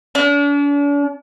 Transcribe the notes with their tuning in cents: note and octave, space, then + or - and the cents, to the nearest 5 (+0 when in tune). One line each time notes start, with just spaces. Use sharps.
D4 -45